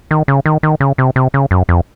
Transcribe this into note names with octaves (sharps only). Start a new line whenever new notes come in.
D#3
C#3
D#3
D#3
C#3
C3
C3
C#3
F#2
F2